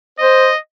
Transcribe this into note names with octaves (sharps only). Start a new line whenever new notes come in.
C5 D#5